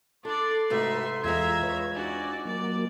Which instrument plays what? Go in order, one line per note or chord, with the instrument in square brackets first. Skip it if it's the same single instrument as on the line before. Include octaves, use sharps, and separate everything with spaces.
[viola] D4 D5 [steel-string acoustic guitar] A4 [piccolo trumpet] C6
[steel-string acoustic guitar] G#2 C3 A3 [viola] D#4 E5 [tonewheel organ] F#4 B4
[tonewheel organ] E2 [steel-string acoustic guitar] G#3 C4 F4 [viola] E5 A#5 [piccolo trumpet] G#6
[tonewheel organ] B4 C#5
[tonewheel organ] D4 D#4 [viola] F#4 D5 [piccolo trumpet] G#5
[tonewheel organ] F#3 A#3 [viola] D5